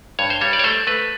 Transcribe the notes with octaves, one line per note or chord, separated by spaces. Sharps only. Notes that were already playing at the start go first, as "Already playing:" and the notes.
G2 C#5
C5
G3 C#5
D5
C#5
A3 C5
A3 B4